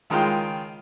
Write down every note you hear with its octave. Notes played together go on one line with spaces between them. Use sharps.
C#2 D#3 G#3 F4 G5